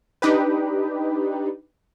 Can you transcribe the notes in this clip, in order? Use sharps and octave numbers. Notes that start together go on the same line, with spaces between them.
D4 D#4 G4 B4